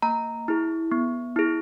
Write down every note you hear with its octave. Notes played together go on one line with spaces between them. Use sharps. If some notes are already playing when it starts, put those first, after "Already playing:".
A#3 A#5
E4 G#4
B3
E4 G#4